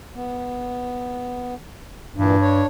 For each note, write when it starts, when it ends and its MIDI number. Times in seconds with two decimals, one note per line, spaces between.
0.15 1.55 59
2.16 2.63 43
2.16 2.36 46
2.16 2.36 52
2.41 2.66 62
2.41 2.66 73